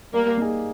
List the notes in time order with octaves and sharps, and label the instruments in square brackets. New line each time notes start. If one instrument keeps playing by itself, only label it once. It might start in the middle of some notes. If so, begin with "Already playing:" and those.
[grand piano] G3 [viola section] A#3
[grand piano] A#3 D#4 G#4